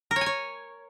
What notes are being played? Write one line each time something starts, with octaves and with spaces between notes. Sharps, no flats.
A#4
C#5
G#5
C#5